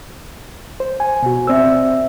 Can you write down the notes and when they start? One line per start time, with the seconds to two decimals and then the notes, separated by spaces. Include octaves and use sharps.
0.80 C5
1.00 G#5
1.22 B2 F#4
1.47 C4 C5 D5 E5 E6